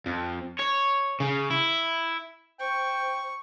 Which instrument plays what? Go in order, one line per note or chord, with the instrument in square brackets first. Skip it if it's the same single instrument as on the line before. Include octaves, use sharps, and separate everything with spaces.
[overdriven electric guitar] F2
C#5
C#3
E4
[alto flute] C5 [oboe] G5 [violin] C#6